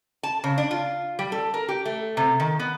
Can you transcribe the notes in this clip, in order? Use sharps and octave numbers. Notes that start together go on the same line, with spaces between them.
A5
C#3
D4
F4
G3
A4
A#4
G4
A3
C3
D#3
B3